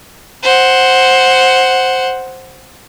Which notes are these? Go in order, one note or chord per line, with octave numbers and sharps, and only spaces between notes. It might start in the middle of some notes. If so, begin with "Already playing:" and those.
C5 F#5